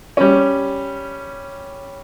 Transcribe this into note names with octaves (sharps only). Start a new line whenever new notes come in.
G3 C#4